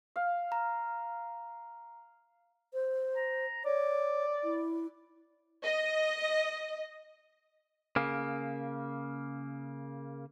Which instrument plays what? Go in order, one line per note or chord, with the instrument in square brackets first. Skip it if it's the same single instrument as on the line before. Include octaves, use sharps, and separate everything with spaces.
[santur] F5
[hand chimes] A#5
[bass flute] C5
[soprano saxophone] A#5
[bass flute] C#5 [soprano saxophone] D5
[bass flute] E4
[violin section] D#5
[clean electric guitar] C#3 A#3